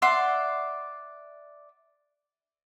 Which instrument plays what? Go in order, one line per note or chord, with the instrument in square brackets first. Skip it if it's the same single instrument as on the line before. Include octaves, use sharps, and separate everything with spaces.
[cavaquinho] D5 E5 F#5 C6